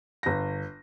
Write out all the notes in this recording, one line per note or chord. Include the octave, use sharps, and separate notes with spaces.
G1 A#6